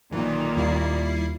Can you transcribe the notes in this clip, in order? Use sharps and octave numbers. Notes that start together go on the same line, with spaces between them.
B1 A#2 D#3 E3 A#3
D#2 G3 E4 C7